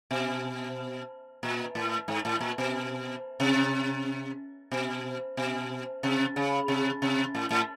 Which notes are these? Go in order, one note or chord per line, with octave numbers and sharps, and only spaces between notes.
B2
A#2
A2
G#2
A2
A#2
B2
C3
B2
B2
C3
C#3
C3
C3
A2
A2